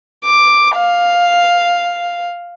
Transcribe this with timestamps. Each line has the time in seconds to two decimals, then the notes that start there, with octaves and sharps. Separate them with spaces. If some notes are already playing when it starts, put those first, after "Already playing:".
0.25 D6
0.76 F5